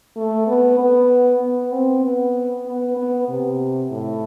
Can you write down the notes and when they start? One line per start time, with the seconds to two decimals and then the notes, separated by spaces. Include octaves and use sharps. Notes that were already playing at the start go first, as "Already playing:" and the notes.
0.16 A3
0.47 B3
0.79 B3
1.41 B3
1.72 C4
2.04 B3
2.66 B3
2.96 B3
3.29 C3
3.91 A2